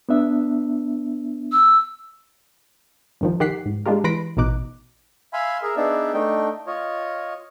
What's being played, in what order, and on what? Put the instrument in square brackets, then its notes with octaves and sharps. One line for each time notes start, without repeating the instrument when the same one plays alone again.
[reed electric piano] B3 D4 E5
[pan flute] E6
[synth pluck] G2 D#3 F3
D#3 G4 F#5 B6 C7
G#2
G#3 D4 F4 G4 A#4
E3 B4 B5 C6 A#6 D7
A1 B2 D#4 D6 F#6
[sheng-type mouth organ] E5 F5 G#5 B5 C6
G#4 A#4 E5
B3 D4 D#4 G#4 D5 E5
A3 D4 D#4 G5
F4 C#5 D#5